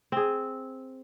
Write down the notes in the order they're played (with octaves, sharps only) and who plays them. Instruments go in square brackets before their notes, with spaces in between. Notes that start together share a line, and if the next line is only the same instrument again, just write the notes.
[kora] C4 G#4